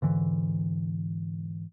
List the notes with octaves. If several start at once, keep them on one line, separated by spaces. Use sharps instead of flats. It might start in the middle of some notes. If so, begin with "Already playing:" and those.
G#2 D3 E3